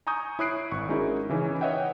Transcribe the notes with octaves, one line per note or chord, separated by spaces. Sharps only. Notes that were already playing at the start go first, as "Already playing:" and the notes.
G#5 A#5 C#6 D#6 G6
E4 C#5 D#6 F#6 C7 D7
G#1 C#6
G#3 C#4 D#4 E4 F#4 A#4
C#3 E3 C#4 D#4
B4 C#5 D#5 E5 F#5 G5